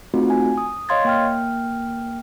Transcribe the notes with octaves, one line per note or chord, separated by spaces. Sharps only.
A3 C4 D#4 F4 F#4
G#5
D#6
C#5 D#5 F5 C6 G#6 A6
A#3 G5 F6